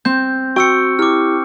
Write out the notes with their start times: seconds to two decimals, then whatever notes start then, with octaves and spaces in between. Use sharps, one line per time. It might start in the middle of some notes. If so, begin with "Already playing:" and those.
0.05 C4 G6
0.56 F#4 G5 C#6 E6 C#7
0.99 E4 G4 D6 F6